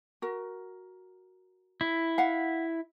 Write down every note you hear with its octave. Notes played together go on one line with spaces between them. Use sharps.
F#4 A#4
E4
F5 F#5